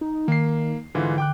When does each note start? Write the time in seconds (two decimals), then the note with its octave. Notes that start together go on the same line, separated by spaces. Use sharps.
0.01 D#4
0.28 D#3 A#3 C7
0.95 G#2 D3 E3 F4
1.18 G5 D6 F#6